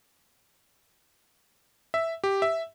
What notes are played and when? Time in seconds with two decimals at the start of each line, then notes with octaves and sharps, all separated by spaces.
1.94 E5
2.24 G4
2.42 E5